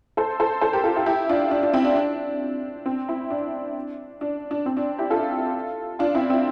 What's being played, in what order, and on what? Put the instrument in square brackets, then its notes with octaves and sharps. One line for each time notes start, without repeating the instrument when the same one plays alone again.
[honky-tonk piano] A4 C5
A4 C5
A4 C5
G4 A#4
F4 A4
E4 G4
E4 G4
D4 F4
D4
D4
C4 E4
D4
D4
C4
C4 E4
D4
D4
D4
C4
D4
E4 G4
F4 A4
D4 F4
C4 E4
C4